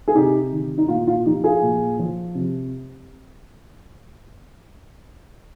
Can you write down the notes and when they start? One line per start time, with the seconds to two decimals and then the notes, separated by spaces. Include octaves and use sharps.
0.08 G#4
0.15 C3 D#4 G4
0.52 D#3
0.78 D#4
0.88 A#2 F4
1.07 F4
1.25 F3 D#4 G4
1.44 F4 G#4
1.62 A#2
1.99 F3
2.35 C3